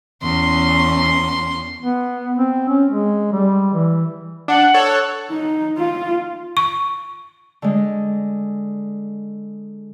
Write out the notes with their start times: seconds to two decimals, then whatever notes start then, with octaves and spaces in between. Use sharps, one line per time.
0.23 E2 C#4 C6
1.83 B3
2.38 C4
2.68 C#4
2.91 G#3
3.32 G3
3.74 E3
4.48 D4 F#5
4.74 A4 C#5
4.87 F#6
5.31 D#4
5.78 F4
6.57 C#6
7.62 D3 G#3